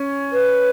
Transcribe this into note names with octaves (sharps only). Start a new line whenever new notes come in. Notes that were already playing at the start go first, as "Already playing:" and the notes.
Already playing: C#4
B4